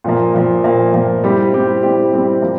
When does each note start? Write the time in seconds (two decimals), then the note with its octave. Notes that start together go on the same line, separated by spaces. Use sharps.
0.04 A#2 F3 A#3
0.34 A#2 F3 A#3
0.64 A#2 F3 A#3
0.94 A#2 F3 A#3
1.24 G3 C4 E4 G4
1.53 G3 C4 E4 G4
1.83 G3 C4 E4 G4
2.13 G3 C4 E4 G4
2.42 F3 A#3